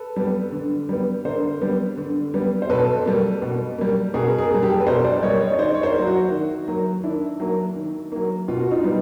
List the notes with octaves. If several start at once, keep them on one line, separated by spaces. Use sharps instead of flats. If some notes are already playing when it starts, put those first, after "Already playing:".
Already playing: A4 B4
G3 B3
D3
G3 B3
D3 A#4 C5
G3 B3
D3
G3 B3
C5
B2 A4 B4
G3 A#3
B2
G3 A#3
B2 G#4 A#4
G#4 A#4
G3 A#3
G4 A4
B4
B2 A#4 C5
C5 D5
G3 A#3 C#5 D#5
C#5 D#5
D#3 C5 D5
C#5
A#4 C5
F#3 A#3
E4 F#4
D#3
F#3 A#3
D#3 D4 E4
F#3 A#3
D#3
F#3 A#3
B2 F4
F#4
D#4 F4
G3 B3